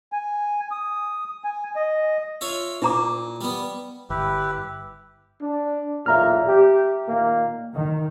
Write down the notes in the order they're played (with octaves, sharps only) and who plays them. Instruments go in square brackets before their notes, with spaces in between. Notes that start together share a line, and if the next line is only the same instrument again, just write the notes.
[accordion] G#5
D#6
G#5
D#5
[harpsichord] F4 C#5 E5
[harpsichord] A#2 [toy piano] E4 A#5 D6
[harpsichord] G3 B3
[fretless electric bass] G1 [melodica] E4 G4 B4
[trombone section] D4
[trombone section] B1 E2 A#2 [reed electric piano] E5 A#5 F6
[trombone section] G4
A#2 D#3 A#3
[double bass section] D#3